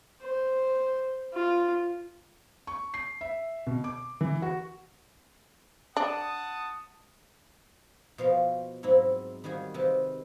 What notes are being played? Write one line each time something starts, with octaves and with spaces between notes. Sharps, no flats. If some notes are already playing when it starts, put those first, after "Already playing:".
C5
F4
C#6
C7
E5
B2
D6
E3
F#4
D4 F#5 A5 D#6
B2 F3 C5 F5
G#2 F#3 C4 E4
D#3 G3 F#4 G#4
C3 D#3 G#3 B4 A5